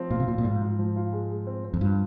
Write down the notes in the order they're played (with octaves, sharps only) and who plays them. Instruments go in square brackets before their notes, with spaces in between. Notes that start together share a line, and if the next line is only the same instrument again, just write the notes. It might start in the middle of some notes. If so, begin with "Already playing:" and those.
Already playing: [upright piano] F3 C4
[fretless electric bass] A#2 [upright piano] F4
[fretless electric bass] C3
[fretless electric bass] A#2 [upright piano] F4
[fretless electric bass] A#2
[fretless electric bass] G#2 [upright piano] F4
[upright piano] F4
F3
F4
G#3
G#3
C4
C4
[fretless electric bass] F2
[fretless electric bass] G2 [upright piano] F4